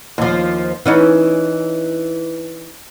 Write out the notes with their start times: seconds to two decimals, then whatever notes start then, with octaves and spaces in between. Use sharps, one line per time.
0.18 D#2 F3
0.86 E3 C#4 D#4